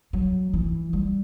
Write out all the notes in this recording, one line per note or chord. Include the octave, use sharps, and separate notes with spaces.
F#3
E3
G3